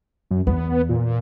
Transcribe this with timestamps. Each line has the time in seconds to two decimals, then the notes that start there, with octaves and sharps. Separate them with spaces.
0.31 F#2
0.47 E2 B3
0.89 A#2